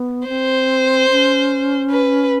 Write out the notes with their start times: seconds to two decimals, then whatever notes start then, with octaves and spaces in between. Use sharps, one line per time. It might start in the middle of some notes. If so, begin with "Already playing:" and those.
Already playing: B3
0.28 C4 C5
1.10 C#4
1.91 B4